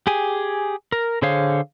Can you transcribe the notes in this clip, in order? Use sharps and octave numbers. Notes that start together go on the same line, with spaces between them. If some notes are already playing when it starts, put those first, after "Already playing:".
G4 G#4 G#5
A#4
D3 G#4 C5 C#5 F5